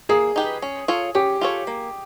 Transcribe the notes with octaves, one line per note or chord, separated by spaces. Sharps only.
A#3 G#4
D#4 G4 B4
C#4
F4 A4 C#5
C#4 G4
F4 A4 C#5
A#3